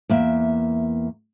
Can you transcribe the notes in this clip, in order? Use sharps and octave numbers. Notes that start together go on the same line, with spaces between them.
E2 A#3 E5